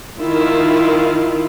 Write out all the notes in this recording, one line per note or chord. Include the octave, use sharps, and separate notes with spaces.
D#3 E4 F4